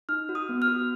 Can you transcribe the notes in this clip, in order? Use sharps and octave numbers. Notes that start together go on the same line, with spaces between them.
D#4 F6
F#4
D#6
B3
F6
F#4